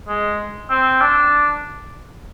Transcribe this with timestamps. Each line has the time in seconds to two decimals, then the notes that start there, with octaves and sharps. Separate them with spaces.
0.08 G#3
0.70 C4
1.01 D4